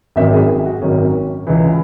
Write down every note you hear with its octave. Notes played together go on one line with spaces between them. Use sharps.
G#1 F#2 D#3 F#3 E5
G#4
G#4
F#4
G#1 F#2 D#3 F#3 C#4
C#2 C#3 E3